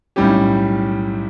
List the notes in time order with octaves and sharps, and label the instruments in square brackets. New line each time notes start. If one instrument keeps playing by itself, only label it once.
[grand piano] B1 A2 G3 C#4 G4